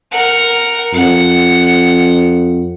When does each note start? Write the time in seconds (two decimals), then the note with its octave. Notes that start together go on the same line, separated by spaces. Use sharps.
0.11 A#4 F#5
0.94 F2 F#5